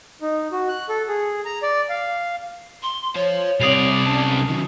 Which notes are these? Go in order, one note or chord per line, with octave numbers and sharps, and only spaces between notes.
D#4
F#4
F#6
A4
G#4
A#5
D5
F5
C6
C5 C#5 F5
C2 G3 C4 D5 D#6 C7 F7
B1 C#4 A5
D#3 F#3